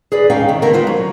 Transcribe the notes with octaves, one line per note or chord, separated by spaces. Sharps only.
G#4 B4 D5
C#4 D#4 F5 G5
C3 D#3
D3 B3 A#4
D#4 F4 B4 C5
F#3